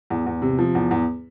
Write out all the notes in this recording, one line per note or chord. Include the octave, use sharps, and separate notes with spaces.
E2
E2
C3
F3
E2
E2